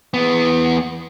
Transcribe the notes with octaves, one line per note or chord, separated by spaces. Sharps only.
E3 B3